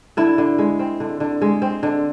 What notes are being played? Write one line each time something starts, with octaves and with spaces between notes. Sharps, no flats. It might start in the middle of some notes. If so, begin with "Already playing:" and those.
D3 E4
D3
G#3
C4
D3
D3
G#3
C4
D3